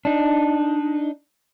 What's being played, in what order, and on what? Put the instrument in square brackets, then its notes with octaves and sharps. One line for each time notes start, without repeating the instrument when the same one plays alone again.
[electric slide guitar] D4 D#4